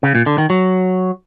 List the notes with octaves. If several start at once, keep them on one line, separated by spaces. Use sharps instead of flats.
C#3
A#2
D3
D#3
F#3